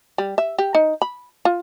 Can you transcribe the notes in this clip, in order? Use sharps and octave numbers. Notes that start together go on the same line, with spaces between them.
G3
E5
G4
D#4
B5
F4